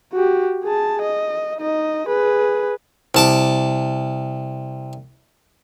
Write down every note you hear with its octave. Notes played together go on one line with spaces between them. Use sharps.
F#4 G4
G#4 A5
D#5
D#4 D#5
G#4 B4
C2 A5 D6